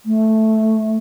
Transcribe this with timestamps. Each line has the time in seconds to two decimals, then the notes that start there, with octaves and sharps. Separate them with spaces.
0.06 A3